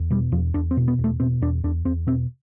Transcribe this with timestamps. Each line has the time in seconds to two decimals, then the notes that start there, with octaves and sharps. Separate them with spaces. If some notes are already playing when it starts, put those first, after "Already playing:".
Already playing: E2
0.10 B2 G3
0.32 E2 F3
0.54 E2 D4
0.71 C4
0.77 B2
0.88 B3
0.99 E2
1.04 A3
1.20 B2 C4
1.42 E2 D4
1.64 E2 D4
1.85 E2 C4
2.07 B2 C4